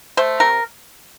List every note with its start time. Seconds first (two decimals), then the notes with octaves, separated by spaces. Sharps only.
0.17 A3 C5
0.40 C3 A#4